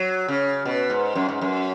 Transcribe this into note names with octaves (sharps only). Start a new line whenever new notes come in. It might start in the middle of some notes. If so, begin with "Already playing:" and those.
Already playing: F#3
C#3
B2
G#2
F#2
G#2
F#2